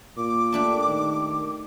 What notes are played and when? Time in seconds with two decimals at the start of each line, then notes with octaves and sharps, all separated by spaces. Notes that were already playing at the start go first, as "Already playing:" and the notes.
0.17 A#2 D6
0.52 A3 D4 G4
0.88 D#3